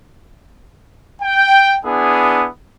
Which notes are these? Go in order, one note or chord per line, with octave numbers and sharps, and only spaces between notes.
G5
B3 D4 E4 G#4